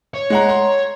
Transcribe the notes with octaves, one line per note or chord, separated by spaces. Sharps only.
C#5
G#3 F#5 A#5
A#5 C6